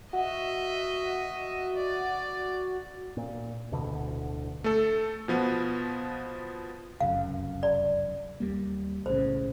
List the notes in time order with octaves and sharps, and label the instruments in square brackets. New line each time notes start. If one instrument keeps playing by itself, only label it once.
[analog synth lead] F#4 [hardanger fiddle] D#5 E5
[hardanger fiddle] D5
[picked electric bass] A#2
D1 D2 B2 D3
[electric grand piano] A3 A4
B2 F3 B3
[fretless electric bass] F1 C#2 F#2 [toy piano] F5
[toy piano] D5
[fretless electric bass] D#2 G3 A#3
[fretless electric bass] B1 A2 C#3 [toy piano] C5